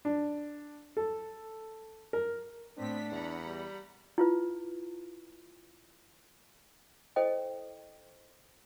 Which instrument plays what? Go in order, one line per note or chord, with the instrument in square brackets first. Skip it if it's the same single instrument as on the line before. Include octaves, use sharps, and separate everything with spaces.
[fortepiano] D4
A4
A#4
[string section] A2 B3 B6 [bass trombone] C4 [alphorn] D4
[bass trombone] E2 [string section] F#5 A#5 B5
[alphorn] G3
[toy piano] E4 F4 B4
E4 A4 C5 D#5 G5